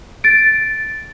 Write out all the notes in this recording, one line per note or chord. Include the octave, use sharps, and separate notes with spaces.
A6 D7